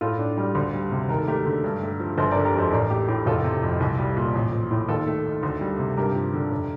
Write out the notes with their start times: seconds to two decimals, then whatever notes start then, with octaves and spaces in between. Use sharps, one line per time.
0.01 A2 F4 A4
0.19 D4
0.38 G3
0.55 D2
0.73 G3
0.92 C3
1.09 D#2 A#4
1.19 A4
1.28 A3 G4 A#4
1.46 D3
1.64 G2
1.82 A3
2.00 F3
2.18 G1 A4 C5
2.31 D3 A#4 D5
2.45 G4 A#4
2.54 F2 A4 C5
2.72 A1 A#4 D5
2.90 A3 G4
3.08 A2 G4
3.26 F1 F4 A4
3.44 C3
3.62 F2
3.80 C2
3.99 G3
4.17 A#2
4.35 A1
4.53 F3
4.71 A2
4.89 D#2 F4 A4
5.07 A3
5.26 D#3
5.43 D2
5.61 G3
5.79 C3
5.97 G2 G4 A#4
6.15 F3
6.34 D3
6.51 F1